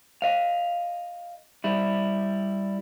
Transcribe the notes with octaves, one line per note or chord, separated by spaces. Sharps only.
D#5 F5
G3 E4